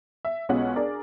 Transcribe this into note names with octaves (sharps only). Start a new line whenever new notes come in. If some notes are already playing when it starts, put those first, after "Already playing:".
E5
B1 G#3 B3 C#4 F4 F#5
D4 G#4 A#4 D5